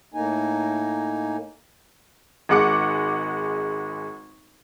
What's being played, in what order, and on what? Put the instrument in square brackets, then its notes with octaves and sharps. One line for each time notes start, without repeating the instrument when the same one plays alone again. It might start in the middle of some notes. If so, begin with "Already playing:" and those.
[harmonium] A2 A#3 D#4 G#5
[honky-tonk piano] G#1 G#3 F#5 D6 C#7